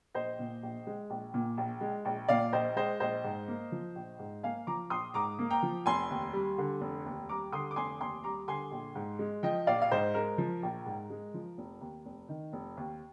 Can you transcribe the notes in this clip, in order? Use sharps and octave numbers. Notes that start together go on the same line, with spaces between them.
A#1 C5 D#5
A#2
A#1
G#3
A#1
A#2
A#1
G#3
A#1
A#2 D5 F5
A#1 C5 D#5
G#3 C5 D#5
A#1 C5 D#5
G#2
A#3
F3
A#1
G#2
A#3 F5 G#5
F3 A#5 D6
A#1 C6 D#6
G#2 A#5 D6
A#3
G5 A#5
F3
F1 G#5 C6
D#2
G3
D3
F1
D#2
G3 A#5 D6
D3 C6 D#6
D6
F1 G#5 C6
D#2 G#5 C6
G3 A#5 D6
D3 G#5 C6
A#1
G#2
G#3
F3 D#5 G5
A#1 D5 F5
F5
G#2 C5 D#5
G#3 A#4
F3
A#1
G#2
G#3
F3
F1
D#2
F1
D#3
F1
D#2